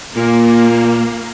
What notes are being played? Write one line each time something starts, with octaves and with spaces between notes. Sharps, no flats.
A#2 A#3